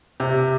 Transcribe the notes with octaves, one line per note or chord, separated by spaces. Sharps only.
C3